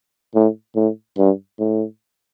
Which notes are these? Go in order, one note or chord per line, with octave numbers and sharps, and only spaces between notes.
A2
A2
G2
A2